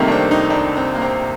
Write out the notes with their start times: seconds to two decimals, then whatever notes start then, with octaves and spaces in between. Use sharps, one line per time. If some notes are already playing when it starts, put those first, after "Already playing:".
Already playing: C2 C3 D#3 A3 A#3
0.08 D4
0.12 C4
0.31 D#4
0.50 D4
0.77 C4
0.95 A#3
1.02 C4